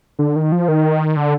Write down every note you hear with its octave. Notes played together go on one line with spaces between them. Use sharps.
D3
D#3
F3
D#3
D3